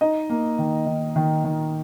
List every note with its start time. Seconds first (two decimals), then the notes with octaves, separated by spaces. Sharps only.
0.01 D#4 D#5
0.30 A#3
0.59 D#3
0.86 D#3
1.16 D#3
1.44 D#3